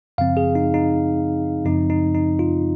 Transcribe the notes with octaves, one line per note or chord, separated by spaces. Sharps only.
F#2 C#3 F3 C4 F5
G#4
D#4
D#4
F#2 C#3 F3 C4 D#4
D#4
D#4
F4